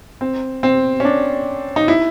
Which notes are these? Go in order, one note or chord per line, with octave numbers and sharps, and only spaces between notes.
C4
C4
C#4
D4
D#4
E4